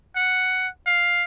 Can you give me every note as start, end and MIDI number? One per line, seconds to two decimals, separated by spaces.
0.16 0.68 78
0.86 1.24 77